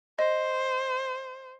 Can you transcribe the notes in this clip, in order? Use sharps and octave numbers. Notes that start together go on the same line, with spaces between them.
C5 D#5